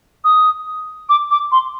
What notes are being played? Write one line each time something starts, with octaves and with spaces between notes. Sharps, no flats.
D#6
D6
D6
C6